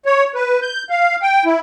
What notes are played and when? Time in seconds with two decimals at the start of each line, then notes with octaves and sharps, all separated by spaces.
0.05 C#5
0.35 B4
0.62 G6
0.90 F5
1.22 G5
1.45 E4